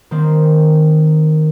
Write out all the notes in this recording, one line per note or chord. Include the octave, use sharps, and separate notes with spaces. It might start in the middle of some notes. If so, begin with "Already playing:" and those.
D#3 A#3 C4